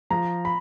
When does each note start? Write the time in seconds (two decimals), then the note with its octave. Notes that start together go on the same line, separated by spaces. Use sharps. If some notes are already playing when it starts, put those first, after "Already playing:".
0.10 F3 A#5
0.45 B5